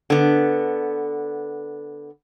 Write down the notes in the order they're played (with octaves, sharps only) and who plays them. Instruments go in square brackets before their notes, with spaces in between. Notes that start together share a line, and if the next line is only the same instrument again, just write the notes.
[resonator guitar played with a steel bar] D3 B3